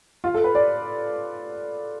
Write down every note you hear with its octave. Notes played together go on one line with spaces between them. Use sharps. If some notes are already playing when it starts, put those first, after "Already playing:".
F4
A4
B4
D5